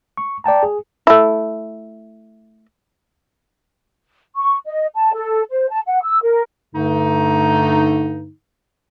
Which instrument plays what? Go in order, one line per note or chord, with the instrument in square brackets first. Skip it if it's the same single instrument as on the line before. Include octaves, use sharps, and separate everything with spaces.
[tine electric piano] C#6
D5 G5 A5 A#5
G#4
[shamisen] A3 E4
[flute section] C#6
D#5
A5
A4
C5
A5
F#5
E6
A#4
[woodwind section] G2 D3 A3 D#4